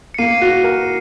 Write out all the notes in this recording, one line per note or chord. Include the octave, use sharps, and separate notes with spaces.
C#7
A#3 C7 D#7
F#4
A#4